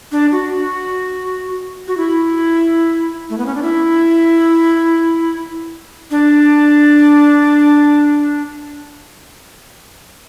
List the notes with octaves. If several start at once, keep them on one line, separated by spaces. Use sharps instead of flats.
D4
F#4
F#4
E4
A3
B3
C#4
D4
E4
D4